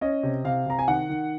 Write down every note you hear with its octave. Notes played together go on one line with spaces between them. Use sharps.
C#4 D#5
C3
C3 F5
C3 A#5
G#5
D#3 F#5
D#3